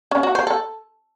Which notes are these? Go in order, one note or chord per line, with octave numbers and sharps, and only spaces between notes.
C#4
F#4
C5
A4